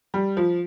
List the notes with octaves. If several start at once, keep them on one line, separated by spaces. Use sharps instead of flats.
G3
F3